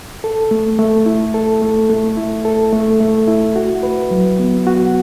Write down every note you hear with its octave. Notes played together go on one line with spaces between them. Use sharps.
A4
A3
A3
E4
A4
A3
A3
E4
A4
A3
A3
E4
F#4
B4
F#3
B3
F#4